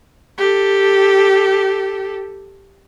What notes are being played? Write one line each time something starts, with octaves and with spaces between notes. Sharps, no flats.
G4 A4